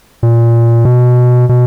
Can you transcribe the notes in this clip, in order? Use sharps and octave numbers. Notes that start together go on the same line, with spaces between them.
A#2
B2
B2